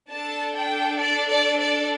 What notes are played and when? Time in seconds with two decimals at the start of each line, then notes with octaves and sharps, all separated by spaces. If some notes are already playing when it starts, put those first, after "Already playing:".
0.10 D4 A4 A5
0.55 G5
1.00 D5
1.30 D5
1.59 D5